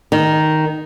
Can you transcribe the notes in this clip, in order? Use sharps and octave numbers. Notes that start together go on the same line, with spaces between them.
D#3